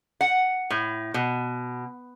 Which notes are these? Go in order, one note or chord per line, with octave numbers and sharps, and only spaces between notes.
F#5
A2
B2